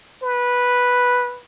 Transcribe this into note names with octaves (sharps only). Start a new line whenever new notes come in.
B4